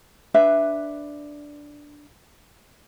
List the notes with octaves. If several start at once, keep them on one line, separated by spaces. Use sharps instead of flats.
D4 B4 E5